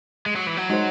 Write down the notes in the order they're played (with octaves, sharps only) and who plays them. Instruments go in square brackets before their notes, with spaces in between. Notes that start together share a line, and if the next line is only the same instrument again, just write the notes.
[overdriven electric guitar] G#3
F#3
E3
F#3
[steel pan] G#3 D#4 F#4 C5